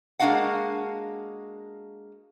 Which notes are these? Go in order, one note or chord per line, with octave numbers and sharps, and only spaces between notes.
G#3 A#3 D4 F#4 F5 F#5